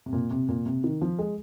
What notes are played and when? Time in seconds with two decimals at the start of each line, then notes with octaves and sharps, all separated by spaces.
0.06 C3
0.13 A#2
0.31 C3
0.48 A#2
0.66 C3
0.84 D#3
1.02 F3
1.19 G#3